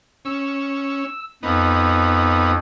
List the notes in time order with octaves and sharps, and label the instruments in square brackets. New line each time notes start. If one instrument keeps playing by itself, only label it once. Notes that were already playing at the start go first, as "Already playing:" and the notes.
[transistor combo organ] C#4 [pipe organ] E6
[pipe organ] F2 [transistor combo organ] B3 D#4